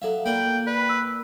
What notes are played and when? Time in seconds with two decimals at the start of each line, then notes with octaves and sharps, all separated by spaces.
0.02 F#3 A4 E5 F5
0.26 A#2 A#3 G5 B5
0.67 B4 D5
0.89 E6